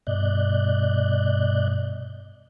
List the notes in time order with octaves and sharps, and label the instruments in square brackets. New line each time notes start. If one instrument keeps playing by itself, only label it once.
[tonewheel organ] G2 B2 D5 D#5 F#6 G6